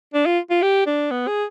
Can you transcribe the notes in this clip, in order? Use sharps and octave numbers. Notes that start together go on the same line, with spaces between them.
D4
F4
F4
G4
D4
B3
G#4